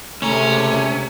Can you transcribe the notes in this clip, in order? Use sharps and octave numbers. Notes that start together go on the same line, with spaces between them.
C#2 C3 A3 C#4 A#5